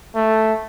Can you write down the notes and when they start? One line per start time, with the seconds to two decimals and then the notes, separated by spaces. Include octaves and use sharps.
0.15 A3